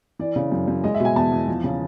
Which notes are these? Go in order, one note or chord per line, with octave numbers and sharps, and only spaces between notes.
E3 D5
C#3
F#2
F#2
G#3 D#5
E5
B2
G#5
E2 A5
E2
F3
C#3